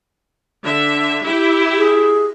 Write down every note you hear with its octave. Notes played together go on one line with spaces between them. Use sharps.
D3 E5
E4 G4 E5
G#4